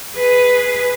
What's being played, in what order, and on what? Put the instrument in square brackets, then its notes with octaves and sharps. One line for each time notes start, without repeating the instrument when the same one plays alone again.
[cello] G#4 B4